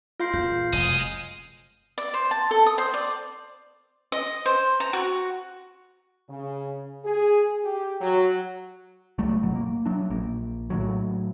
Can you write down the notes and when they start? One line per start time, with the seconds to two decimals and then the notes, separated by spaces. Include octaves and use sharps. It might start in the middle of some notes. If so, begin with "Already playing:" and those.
0.20 F4 F5 C6 F6 G6 C7
0.34 E2 A#2 G6
0.73 F1 F#2 G#4 D#5
1.98 D5
2.14 C5
2.31 A5
2.51 A4
2.66 D#6
2.78 C5
2.94 D5
4.12 D#5
4.46 C5
4.80 A#5
4.93 F#4
6.29 C#3
7.04 G#4
7.63 G4
8.01 F#3
9.18 C#2 F#3 G3 A3
9.42 G1 B2 F#3
9.56 A#3
9.86 F#3 D4
10.10 A#1 A#3
10.70 A2 D#3 F#3